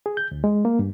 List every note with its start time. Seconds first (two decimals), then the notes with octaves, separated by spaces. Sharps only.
0.06 G#4
0.17 G6
0.31 D2
0.44 G#3
0.65 A#3
0.79 G2